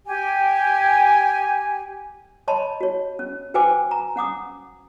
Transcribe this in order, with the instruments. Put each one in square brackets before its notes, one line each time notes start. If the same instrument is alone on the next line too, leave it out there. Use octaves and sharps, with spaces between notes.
[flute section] G4 G#5
[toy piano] C#5 D#5 A5 B5 C6
F#4 C#5
C#4
F#4 B4 C5 G5 G#5 D6
A#5
C#4 F#5 D6 D#6